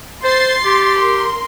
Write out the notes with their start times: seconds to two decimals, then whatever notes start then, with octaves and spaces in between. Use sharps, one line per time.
0.24 C5 C6 A6 C7
0.65 G4
0.97 A#4 C6